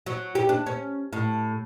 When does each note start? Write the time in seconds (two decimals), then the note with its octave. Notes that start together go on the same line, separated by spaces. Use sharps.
0.06 F#3
0.35 G4
0.49 D4
0.66 C#4
1.13 A2